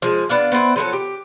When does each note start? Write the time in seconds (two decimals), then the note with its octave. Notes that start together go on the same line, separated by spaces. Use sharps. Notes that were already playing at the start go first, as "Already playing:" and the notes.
0.02 F3 G#3
0.29 B3 D4 F5
0.52 B3 C4 E4
0.76 F3 F#3 A4
0.93 G4